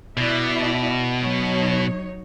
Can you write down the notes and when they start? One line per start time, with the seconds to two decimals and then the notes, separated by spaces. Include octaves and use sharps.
0.17 B2 E4 D5 E5
1.22 F#3 D#4 C#5